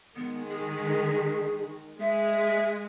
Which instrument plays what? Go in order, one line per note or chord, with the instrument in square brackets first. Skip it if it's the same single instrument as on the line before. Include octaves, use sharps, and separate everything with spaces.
[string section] D#3 G#3 [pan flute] B3
[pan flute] G#4
[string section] G#3 [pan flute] E5